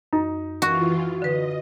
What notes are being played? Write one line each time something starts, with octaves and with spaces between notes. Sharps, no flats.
F#2 D#4
E3 F4 F#4
D3 B4 D#5